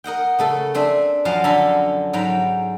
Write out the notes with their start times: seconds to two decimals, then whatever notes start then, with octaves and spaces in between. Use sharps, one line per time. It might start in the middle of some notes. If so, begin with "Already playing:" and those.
0.04 A#4 D#5 F#5 G5
0.39 C#3 A3 A4
0.75 C4 D4 E5 G#5
1.25 F#2 F3 F#3 F5 A5
1.44 D3 A4 A#5 B5
2.13 G#2 F#3 G5 A#5 B5